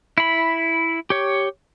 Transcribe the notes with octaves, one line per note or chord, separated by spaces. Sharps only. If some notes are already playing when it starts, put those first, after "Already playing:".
E4 B5
G4 C#5